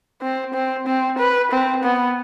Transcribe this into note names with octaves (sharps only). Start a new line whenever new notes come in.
C4
C4
C4
B4
C4
B3